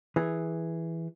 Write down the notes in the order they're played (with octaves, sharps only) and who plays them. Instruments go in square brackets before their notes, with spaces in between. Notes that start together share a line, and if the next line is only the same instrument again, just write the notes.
[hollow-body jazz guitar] E3 G#4